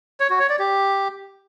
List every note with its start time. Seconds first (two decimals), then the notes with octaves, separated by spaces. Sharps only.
0.20 C#5
0.30 F#4
0.40 C#5
0.49 D5
0.59 G4